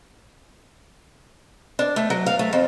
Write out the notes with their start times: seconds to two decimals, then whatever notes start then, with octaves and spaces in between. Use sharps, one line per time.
1.79 D4
1.96 A3
2.10 F#3
2.26 F5
2.39 A3
2.53 F2